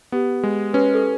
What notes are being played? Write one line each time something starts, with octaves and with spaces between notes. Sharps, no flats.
B3 G4
G#3
C#4 B4
A4